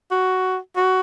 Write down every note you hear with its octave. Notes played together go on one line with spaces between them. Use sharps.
F#4
F#4